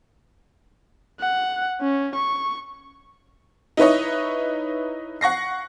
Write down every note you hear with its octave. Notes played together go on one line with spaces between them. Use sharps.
F#5
C#4
C#6
D#4 E4 B4 C#5 D#5
F#5 C#6 A#6 C7